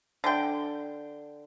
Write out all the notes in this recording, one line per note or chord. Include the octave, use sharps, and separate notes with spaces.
D3 G5